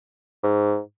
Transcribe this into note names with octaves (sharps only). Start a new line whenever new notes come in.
G#2